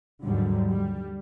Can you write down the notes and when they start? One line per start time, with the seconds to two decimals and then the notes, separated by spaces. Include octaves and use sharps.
0.24 D#2 G#2 D3 F#3 G3
0.69 G3